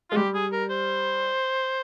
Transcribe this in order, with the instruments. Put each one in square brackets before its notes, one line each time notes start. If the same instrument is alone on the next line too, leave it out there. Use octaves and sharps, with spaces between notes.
[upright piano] G#3 [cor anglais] F4
[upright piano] G3 [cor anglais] G4
[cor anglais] G#4
A#4
C5